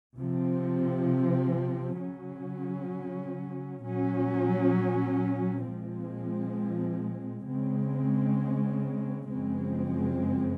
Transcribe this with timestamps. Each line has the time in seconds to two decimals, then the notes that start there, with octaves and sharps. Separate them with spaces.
0.17 C3 F3 C4
2.00 C#3 F#3 C#4
3.82 A#2 F#3 C#4
5.65 A#2 F3 G#3 C4
7.46 C#3 G#3 C4
9.28 F#2 C#3 F3 G#3 C4